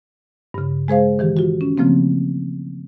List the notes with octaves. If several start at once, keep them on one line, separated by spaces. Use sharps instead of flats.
G2 C#3
G#3 G#4 C5 F5
D#3 E3 G4
F4 F#4
C#4
C#3 F3 A3 A#3 C4